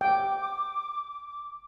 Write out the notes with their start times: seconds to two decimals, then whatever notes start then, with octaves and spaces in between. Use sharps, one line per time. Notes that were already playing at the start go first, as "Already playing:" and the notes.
0.01 G5 D6